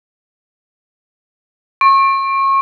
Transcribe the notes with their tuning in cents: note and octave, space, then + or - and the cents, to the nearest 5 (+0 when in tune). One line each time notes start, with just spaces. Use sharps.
C#6 -30